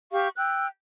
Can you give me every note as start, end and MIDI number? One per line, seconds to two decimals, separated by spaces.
0.12 0.29 67
0.12 0.29 77
0.12 0.29 85
0.37 0.67 79
0.37 0.67 88
0.37 0.67 90